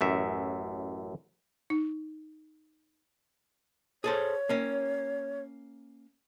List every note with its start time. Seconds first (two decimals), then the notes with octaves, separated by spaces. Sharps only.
0.01 A1 F#2 E5
1.70 D#4
4.04 G#4 A4 C5 C#5
4.49 A#3 C#4